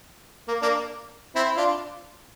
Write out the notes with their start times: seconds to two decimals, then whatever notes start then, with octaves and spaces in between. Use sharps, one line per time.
0.48 A#3
0.62 A#3 D4
1.35 C4 E4
1.57 D4 F4